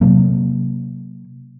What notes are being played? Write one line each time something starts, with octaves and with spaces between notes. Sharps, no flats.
C3 F#3 A#3